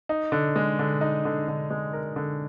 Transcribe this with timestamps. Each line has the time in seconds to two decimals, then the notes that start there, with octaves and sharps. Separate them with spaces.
0.09 D#4
0.32 D3
0.56 G#3
0.79 D3
1.01 D#4
1.25 D3
1.48 D3
1.71 G#3
1.93 A#4
2.16 D3